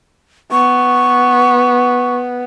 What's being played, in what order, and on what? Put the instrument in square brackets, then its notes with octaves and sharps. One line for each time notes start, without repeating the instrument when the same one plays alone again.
[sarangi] B3 [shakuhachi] C#6